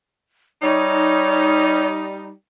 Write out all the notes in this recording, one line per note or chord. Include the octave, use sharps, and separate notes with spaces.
G3 D#4 C#5